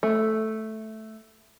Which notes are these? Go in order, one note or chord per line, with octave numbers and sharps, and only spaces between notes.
A3